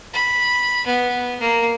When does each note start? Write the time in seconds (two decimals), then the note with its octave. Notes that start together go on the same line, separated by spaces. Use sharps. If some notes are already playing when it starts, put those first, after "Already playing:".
0.14 B5
0.86 B3
1.40 A#3